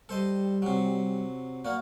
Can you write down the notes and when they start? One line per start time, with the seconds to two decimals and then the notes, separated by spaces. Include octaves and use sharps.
0.09 G3 A4 C5 D#5
0.62 C3 F#3
1.65 A#3 F#4 D5